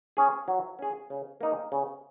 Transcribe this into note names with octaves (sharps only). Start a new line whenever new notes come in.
C#4 G#4
F#3
C#4 G#4
C#3
A#3 D#4
C#3